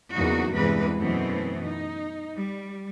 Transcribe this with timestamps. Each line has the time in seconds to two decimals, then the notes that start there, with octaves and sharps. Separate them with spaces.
0.12 E2 C#3 F#3 A#3 D#4 F#4
0.52 E2 G2 C3 E3 G#3 B4
0.97 F#2 B2 E3 A3 B3 C4
1.65 D#4
2.35 G3